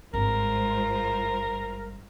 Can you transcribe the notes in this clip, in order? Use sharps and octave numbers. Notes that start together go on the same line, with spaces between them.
G#1 G2 G#3 F4 A#4 C5